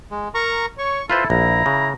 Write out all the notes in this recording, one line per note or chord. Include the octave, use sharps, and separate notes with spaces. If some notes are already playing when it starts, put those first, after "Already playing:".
G#3
A#4 A#5 C#6
C#5 C#6
E4 F4 A4 B4 C5
A#1 A#5
C#3